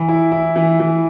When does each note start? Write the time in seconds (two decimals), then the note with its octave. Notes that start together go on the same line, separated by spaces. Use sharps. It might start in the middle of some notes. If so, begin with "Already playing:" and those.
Already playing: E3
0.08 E4
0.32 E4
0.56 E3
0.80 E3